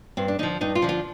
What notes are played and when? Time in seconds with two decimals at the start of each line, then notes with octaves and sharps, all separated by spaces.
0.17 G2 C4
0.28 D4
0.39 D3 D#4
0.43 F3
0.61 G2 D#4
0.75 F4
0.82 D3 F3
0.89 F4